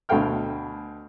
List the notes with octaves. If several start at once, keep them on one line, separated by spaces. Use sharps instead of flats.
D2 B2 A4 F5 G5 F6